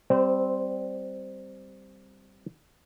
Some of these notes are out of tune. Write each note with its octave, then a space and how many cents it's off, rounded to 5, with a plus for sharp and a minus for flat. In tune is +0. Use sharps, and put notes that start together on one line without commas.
G3 +0 C4 +0 C5 -30